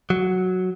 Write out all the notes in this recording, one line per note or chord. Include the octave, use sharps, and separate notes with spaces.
F#3